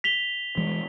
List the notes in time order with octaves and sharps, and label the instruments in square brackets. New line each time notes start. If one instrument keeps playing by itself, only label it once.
[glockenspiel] B6 F7 G7
[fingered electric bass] E3 G#3